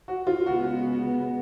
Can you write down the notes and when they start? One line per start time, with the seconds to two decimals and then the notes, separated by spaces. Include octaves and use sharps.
0.08 F#4
0.27 F4
0.46 C#3 G#3 B3 F#4